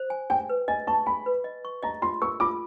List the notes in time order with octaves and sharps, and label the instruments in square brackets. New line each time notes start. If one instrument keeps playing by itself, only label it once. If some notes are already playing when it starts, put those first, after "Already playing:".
Already playing: [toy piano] C5
G#5
[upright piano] G5 [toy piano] G#5
[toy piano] B4
[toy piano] D#5 [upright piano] G#5
[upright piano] A5 [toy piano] C#6
[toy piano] G#5 [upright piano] B5
[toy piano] B4
D#5
C#6
[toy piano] D#5 [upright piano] A#5
[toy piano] F4 [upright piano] C6
[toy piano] A#4 [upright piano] C#6
[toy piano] F4 [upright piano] D6